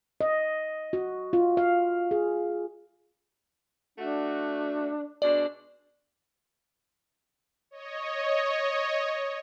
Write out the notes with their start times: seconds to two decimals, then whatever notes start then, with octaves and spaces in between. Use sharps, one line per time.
0.21 D#5
0.93 F#4
1.33 F4
1.57 F5
2.11 G#4
3.98 A3 D4 F#4
5.22 B2 G#3 D4 D5
7.71 C#5 D#5